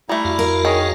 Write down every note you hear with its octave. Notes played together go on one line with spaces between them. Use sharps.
G3 A3 E4 A#5
F2 F#4 F5
A#4
D#3 G#4 C#5 D#5